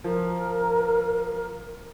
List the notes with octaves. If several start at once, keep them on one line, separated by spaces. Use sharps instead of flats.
F3 A#4